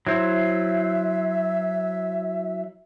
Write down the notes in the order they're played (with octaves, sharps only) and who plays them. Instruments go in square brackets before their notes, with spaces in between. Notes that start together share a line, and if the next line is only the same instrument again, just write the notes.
[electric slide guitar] F#3 E4 C5 [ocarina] E5